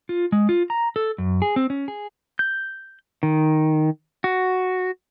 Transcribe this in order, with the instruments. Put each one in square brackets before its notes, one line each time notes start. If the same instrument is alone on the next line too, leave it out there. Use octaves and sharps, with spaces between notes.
[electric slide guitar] F4
G#3
F4
A#5
A4
F#2
G#4
C4
C#4
G#4
[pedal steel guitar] G6
D#3
F#4